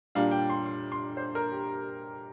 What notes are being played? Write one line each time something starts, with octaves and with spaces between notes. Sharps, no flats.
A#2 G3 D4 F5
G5
C6
C6
C6
C5
A#4
G4